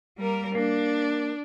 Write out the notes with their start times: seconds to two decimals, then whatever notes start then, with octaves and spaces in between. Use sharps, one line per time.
0.18 G3 A#3 A#4
0.55 A#3 D4